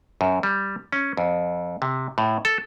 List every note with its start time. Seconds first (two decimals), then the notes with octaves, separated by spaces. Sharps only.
0.21 F#2
0.43 G3
0.92 C#4
1.17 F2
1.82 C3
2.18 A2
2.45 A4